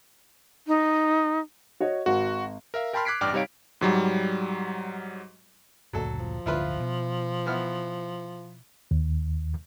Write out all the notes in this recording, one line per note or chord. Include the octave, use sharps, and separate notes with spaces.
D#4
F#4 C#5 D#5
G#1 F#4
A#4 E5 F5
A#4 G5 A5 B5 C6 F6
D6 F#6 G#6 B6 C7 D7
A1 G2 D5 G5 D6 F6
C3 G3 D#4 C#5 F5 D7
G#2 F#3 G3
F#1 D2 A#2 F#3 A4
F3
D1 G1 D3 E4 F4 B4
B2
E3 B3 F6
D#2